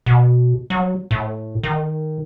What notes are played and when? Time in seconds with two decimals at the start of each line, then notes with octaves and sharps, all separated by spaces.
0.06 B2
0.70 F#3
1.11 A2
1.63 D#3